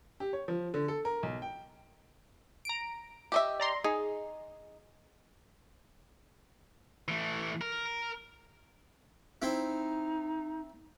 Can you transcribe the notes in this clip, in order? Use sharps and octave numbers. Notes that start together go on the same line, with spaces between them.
G4
C#5
F3
D3
A4
A#4
B1
G5
A#5 D7
G4 D#5 E5
D5 A#5 C6
D#4 G#4
E3 A3
A#4
C4 D#4 E4